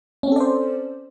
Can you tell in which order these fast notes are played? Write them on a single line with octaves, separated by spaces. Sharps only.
C#4 C4 A4 D5 C5